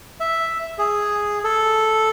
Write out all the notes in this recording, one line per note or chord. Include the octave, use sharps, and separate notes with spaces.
E5
G#4
A4